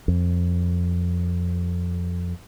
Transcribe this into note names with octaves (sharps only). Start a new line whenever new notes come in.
F2